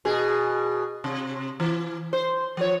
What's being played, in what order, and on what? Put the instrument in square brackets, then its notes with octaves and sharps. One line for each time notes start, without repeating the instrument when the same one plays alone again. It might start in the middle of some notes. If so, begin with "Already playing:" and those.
[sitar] B2 G#4
C3
E3
C5
F3 C#5